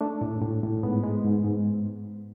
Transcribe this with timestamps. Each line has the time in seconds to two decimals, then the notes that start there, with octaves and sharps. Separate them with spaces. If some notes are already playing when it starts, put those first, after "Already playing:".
0.01 A3 D4
0.21 A2
0.42 A2
0.63 A2
0.83 G#2 B3
1.03 G#3
1.24 G#2
1.45 G#2